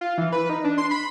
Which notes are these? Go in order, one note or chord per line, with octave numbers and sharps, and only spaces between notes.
F4
E3
B4
D#4
D4
C6
B5